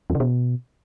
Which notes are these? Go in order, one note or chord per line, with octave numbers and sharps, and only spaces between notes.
E2
C#3
B2